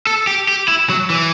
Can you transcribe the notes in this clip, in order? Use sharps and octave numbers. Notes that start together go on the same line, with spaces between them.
A4
G4
G4
E4
F#3
E3